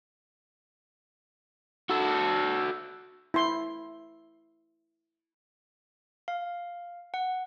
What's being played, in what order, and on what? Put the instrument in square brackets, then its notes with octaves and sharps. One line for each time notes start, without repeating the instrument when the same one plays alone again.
[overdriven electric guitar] F#4 A4
[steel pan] E4 C6
[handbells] F5
F#5